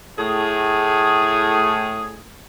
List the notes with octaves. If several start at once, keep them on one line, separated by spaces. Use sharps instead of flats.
A2 G#4